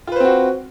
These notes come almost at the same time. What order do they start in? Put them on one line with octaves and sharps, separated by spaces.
F4 B4 C5 C4 F#4